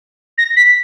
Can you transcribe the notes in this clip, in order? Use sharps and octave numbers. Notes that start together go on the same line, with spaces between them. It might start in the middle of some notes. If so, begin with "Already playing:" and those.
A#6
B6